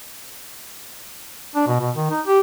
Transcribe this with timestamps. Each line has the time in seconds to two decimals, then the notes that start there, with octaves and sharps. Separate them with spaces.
1.55 D4
1.67 B2
1.81 B2
1.96 D#3
2.10 D#4
2.27 G4